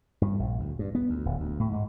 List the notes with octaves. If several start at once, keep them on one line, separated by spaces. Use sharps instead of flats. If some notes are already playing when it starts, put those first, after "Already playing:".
G2
A#1
D2
G2
B3
D2
D1
D2
A2
G#2